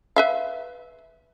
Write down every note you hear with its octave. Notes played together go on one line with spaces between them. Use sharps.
B4 E5 F5